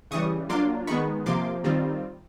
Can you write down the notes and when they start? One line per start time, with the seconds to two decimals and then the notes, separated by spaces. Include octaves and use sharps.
0.11 C#3 E3 G3 C#6 D#6
0.49 F#3 A#3 D4 F4 C6 D6
0.87 D#3 G#3 B3 B5 C#6
1.26 C3 F3 A#3 C6 D6
1.64 D#3 G3 C4 F4